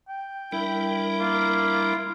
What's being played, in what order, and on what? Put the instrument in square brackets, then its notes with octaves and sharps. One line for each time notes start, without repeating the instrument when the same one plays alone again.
[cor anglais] G5
[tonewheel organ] G3 D4 A#4 [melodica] E4
[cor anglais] A#3 [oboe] F4